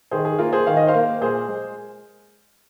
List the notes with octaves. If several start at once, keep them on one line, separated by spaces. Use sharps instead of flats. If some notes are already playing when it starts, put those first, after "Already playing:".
D#3 G#4 C5
G#4
A#3 F4 A#4
G#4 C5
D#3 F5
D#5
C5 F5
A#3
A#2 G#4 C5
G#3